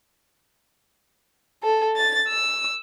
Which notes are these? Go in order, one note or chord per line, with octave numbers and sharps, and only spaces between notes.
A4
A6
E6